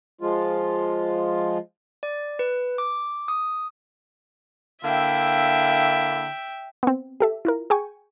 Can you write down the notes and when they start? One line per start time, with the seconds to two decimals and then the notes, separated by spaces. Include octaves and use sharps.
0.21 F3 G#3 F4
2.03 D5
2.39 B4
2.78 D6
3.28 D#6
4.84 D3 A#3 E4 E5 G5
6.83 B3 C4
7.20 G4 A4 E5
7.45 E4 F4 A#4
7.70 G#4 G5 G#5 C#6